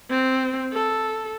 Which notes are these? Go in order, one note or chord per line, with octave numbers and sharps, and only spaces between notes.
C4
A4